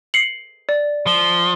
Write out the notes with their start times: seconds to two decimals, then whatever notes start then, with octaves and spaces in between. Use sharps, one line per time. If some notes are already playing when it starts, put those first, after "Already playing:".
0.14 C7 C#7 F#7
0.69 D5
1.07 F3 G7